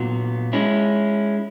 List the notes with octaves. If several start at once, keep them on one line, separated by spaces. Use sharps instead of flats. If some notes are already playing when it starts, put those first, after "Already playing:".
Already playing: A#2 F#3 B3
G#3 C#4 E4